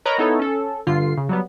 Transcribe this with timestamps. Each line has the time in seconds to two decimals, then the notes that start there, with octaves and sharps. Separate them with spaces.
0.05 A#4 B4 C#5 D#5 A#5 B5
0.18 B3 D#4 E4 A4 C#5
0.39 C#4 A4
0.87 G2 D3 F4 C7
1.17 C#3
1.29 F#3 G3 B3